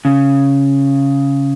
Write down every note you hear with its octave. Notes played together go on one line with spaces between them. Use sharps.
C#3